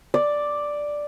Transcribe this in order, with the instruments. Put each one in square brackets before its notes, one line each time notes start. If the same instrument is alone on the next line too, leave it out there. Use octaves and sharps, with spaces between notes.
[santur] D5